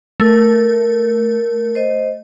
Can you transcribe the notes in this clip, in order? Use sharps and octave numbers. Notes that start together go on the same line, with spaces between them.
A3 A#4
C5 D#5